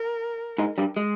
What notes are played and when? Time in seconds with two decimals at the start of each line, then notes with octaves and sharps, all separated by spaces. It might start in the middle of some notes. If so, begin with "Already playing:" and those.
Already playing: A#4
0.58 G#2 G#3
0.78 G2 G3
0.97 G#3